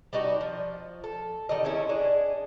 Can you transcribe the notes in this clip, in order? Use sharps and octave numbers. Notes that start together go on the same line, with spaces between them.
G3 D4 D#4 F#4
F3
A4
D#3 G3 D#5
G#3 A3 C#4 E4
D4 G#4 D#5